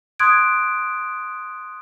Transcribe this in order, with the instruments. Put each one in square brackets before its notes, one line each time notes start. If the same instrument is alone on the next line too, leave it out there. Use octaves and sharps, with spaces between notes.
[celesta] C6 D#6 F#6 G#6 D7